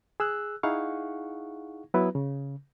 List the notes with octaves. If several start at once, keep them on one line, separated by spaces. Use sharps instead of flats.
G#4 E6 F#6
D#4 E4 G#4 F5 F#5 C#6
F#3 B3 E4 B4
C#3